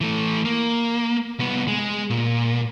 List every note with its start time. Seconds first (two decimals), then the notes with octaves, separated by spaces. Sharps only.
0.01 E3 A3
0.45 A#3
1.39 C2 B3
1.68 G#3
2.10 A#2